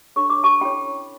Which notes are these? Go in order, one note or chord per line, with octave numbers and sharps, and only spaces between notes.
D4 A4 C#5 C#6
D6
A5 C#6
C#4 E4 A4 C#5 G5 B5